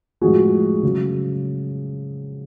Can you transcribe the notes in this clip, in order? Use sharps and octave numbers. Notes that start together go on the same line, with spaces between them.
A2 F3 G#3 F#4 G#4
C#3 F#3